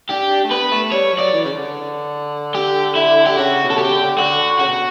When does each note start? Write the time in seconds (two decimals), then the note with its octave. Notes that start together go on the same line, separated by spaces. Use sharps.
0.10 D4 G4
0.30 D4
0.44 A3
0.50 B3 B4
0.71 A3
0.91 G3 C#5
1.12 F#3
1.19 D5
1.33 E3
1.45 C#3
1.53 D3
2.55 G4
2.96 E4
3.26 G4
3.37 C#3 F#4
3.64 B2
3.70 A4
3.78 C#3 G4
3.91 D3
4.18 D3 F#4
4.59 C#3 F#4
4.67 B2